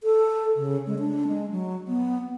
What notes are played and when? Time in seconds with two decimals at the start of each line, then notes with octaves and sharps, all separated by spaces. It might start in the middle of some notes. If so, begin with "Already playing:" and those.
0.03 A4
0.56 C#3
0.87 G#3
0.99 D4
1.28 G#3
1.51 F#3
1.88 B3